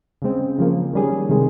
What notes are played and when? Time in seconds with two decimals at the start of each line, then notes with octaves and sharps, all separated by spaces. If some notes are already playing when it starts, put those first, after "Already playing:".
0.22 C#3 G#3 C4
0.58 C#3 F3 A#3
0.93 D#3 G3 C#4 G#4
1.29 C3 D#3 G#3